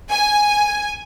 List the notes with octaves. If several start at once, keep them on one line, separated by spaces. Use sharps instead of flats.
G#5